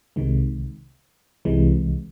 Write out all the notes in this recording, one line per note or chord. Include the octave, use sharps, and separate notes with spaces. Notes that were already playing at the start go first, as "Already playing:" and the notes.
C2 C3 D#3 G#3
C2 C3 E3 G#3